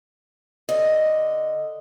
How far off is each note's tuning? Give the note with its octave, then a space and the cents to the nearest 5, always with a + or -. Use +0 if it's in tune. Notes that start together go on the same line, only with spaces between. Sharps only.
D3 +5 D#5 +0